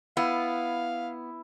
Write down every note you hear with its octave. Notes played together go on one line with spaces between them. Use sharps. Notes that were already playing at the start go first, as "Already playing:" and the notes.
B3 E4 F5